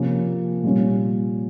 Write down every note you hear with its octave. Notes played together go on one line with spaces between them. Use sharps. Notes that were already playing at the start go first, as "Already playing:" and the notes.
Already playing: C3 F3 A#3 C#4
A#2 G3 C#4